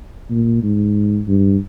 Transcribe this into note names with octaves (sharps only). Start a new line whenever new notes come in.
A#2
G#2
G2